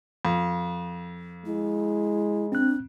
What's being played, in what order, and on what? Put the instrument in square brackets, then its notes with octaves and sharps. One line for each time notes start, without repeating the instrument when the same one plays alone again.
[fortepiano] F2
[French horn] G#3 [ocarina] E4
[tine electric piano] C4 F#6 [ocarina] D4